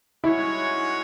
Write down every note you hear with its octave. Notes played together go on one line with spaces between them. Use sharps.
G#3 C#4 E4 F#4 C#5 F#5